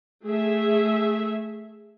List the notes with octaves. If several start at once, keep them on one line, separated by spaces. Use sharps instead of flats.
A3 G#4 E5